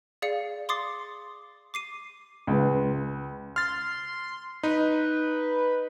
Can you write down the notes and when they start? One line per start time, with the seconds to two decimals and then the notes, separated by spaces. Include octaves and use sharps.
0.22 G#4 D5 F5 C#7
0.69 C6 D6 D#6 A6 C7
1.74 D6 C7 D#7
2.47 C#2 B4
3.56 C6 F6 A6
4.63 D#4 B4